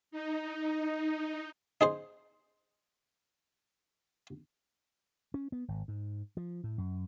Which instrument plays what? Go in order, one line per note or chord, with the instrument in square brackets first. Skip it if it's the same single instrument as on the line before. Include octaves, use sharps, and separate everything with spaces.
[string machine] D#4
[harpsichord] D#4 G#4 C5
[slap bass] C#4
B3
G#1
G#2
F3
A2
F#2